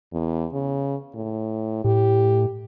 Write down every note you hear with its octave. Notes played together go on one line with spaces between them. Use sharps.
E2
C#3
A2
A2 G4